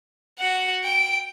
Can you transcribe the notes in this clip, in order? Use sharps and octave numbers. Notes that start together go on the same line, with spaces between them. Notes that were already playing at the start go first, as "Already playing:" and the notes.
F#4 F#5
G5 D7